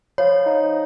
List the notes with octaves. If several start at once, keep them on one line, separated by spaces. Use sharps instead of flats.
F3 C#5
D#4